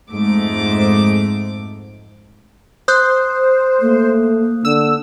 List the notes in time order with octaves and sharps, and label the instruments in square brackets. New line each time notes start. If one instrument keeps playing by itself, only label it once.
[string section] F2 G#2 A3 D6
[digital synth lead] C5 [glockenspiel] D#6 F#6 G6
[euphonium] A3 [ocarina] A#3
[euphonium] D3 [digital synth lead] E6